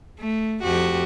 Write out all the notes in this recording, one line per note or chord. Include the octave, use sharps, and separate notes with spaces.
A3
F2 F#4 G4